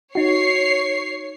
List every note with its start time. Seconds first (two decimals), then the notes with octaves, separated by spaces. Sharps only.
0.15 D#4 F#4 C#5 C7